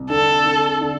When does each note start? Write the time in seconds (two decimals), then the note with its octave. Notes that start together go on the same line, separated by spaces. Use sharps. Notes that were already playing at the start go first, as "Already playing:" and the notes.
Already playing: C2
0.10 D3 A4
0.45 D3
0.81 D3